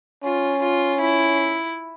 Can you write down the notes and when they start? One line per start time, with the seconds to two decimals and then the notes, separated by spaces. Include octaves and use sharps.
0.24 C#4 F4
0.63 F4
1.01 E4